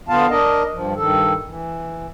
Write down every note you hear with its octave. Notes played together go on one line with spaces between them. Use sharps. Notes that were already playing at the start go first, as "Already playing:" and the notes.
D3 B3 F4 F5 A5
D4 A#4 D#5
G2 F3
G2 D#3 A4
E3